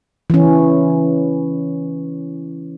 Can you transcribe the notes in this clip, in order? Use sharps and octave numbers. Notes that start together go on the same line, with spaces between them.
E3 C#4